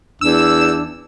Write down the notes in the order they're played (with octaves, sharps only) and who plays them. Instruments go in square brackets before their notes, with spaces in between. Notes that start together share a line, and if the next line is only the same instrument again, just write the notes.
[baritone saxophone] E2 [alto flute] D4 [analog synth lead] E6